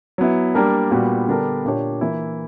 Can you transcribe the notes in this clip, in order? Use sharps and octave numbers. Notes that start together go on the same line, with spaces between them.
F#3 B3 E4
G3 A#3 D4 A#4
A#2 G3 B3 F#4
D3 G3 B3 D4 A#4
A#2 A#3 D4 G4 C#5
E3 A#3 E4